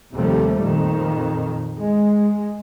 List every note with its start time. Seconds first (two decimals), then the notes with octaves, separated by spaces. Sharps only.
0.14 D#2 C3 F3 G3 A3
0.63 F2 A#2 D#3
1.80 G#3